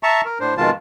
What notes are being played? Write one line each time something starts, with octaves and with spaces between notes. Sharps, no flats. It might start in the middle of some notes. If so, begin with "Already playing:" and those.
E5 A5 A#5 C#6
A#4
A2 D4 C5
F2 B2 D#3 G#3 F4 A5